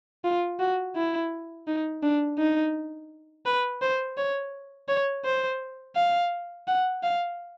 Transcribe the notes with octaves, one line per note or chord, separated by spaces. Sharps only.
F4
F#4
E4
D#4
D4
D#4
B4
C5
C#5
C#5
C5
F5
F#5
F5